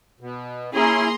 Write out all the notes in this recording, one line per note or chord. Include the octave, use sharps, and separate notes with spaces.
B2
A#3 C#4 E4 G#4 A#5 C6